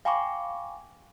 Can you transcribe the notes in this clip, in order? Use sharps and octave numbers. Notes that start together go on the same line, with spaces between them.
F5 G5 G#5 B5 C#6 D6